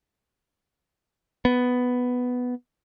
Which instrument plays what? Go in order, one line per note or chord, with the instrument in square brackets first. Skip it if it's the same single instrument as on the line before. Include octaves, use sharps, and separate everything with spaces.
[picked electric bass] B3